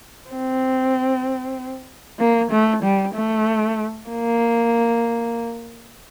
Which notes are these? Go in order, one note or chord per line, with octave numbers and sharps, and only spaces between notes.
C4
A#3
A3
G3
A3
A#3